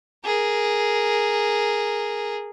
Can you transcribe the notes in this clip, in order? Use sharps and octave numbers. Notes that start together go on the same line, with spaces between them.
G#4 A#4